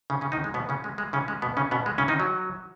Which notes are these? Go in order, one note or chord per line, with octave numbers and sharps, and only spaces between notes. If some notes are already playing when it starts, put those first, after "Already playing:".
C#3 C#4
C#3 C#4
D#3 D#4
G#3
B2 B3
C#3 C#4
G#3
G#3
C#3 C#4
G#3
B2 B3
C#3 C#4
B2 B3
G#3
C#3 C#4
D#3 D#4
F#3